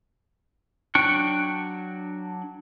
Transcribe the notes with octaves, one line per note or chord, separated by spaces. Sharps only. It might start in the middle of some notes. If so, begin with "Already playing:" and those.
F#3 D4 G5 C#6 F#6